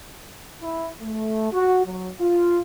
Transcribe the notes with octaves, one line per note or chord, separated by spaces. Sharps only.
E4
A3
F#4
F#3
F4